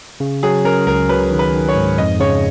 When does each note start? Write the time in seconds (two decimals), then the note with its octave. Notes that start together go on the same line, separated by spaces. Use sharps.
0.20 C#3
0.43 F#3 G#4
0.65 C#4 A#4
0.87 C#2 A#4
1.09 F#3 B4
1.31 D#3
1.39 B4
1.54 D#3
1.69 C#5
1.76 G#2
1.98 F2 D#5
2.20 C#3 C#5